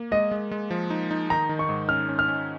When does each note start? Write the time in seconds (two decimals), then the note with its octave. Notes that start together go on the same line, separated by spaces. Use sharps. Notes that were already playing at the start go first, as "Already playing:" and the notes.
Already playing: A#3
0.11 G#3 D#5
0.31 G#3
0.51 G#3
0.71 F3
0.90 D#4
1.11 D#4
1.30 D#3 A#5
1.49 D#3
1.59 C#6
1.69 G#2
1.89 C#4 F6
2.09 C#4
2.19 F6
2.28 C#4